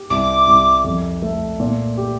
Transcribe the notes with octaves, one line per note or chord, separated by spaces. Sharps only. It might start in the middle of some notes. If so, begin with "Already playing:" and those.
Already playing: G4
C2 D6
C2
F2
A3
A#2
G4